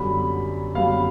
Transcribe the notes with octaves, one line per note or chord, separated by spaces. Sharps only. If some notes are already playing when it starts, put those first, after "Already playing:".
Already playing: F#2 D3 G3 B3 B5
F#2 D3 G3 B3 F5